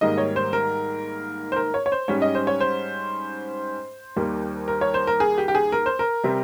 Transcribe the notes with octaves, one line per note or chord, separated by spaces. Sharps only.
G#2 D#3 G3 A#3 D#5
C#5
C5
A#4
C5
A#4
C#5
C#5
C5
G#2 G3 C#4 C#5
D#5
C5
C#5
C5
D#2 D#3 G3 A#3
A#4
C#5
C5
A#4
G#4
G4
G4
G#4
A#4
C5
A#4
C3 G3 C4